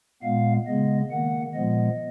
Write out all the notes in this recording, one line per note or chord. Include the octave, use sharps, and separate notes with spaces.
A#2 G#3 B3 F5
C#3 G#3 B3 D#5
D#3 A#3 F#5
A#2 F3 G#3 B3 D#5